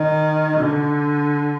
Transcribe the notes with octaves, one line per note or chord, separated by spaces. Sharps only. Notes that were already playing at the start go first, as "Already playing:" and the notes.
Already playing: D#3
D3